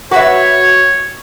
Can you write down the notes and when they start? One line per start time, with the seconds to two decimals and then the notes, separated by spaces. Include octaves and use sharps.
0.11 F#4 B4 C#5 E5